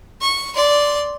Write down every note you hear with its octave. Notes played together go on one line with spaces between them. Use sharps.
C#6
D5 C6